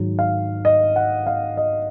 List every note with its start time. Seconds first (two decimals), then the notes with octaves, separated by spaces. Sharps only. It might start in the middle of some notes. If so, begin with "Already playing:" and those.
Already playing: G#2 D#3 F#3
0.19 F5
0.65 D#5
0.96 F#5
1.27 F5
1.57 D#5